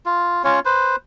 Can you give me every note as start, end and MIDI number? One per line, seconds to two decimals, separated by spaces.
0.06 0.44 65
0.44 0.60 61
0.44 0.60 65
0.44 0.60 73
0.65 0.96 71
0.65 0.96 72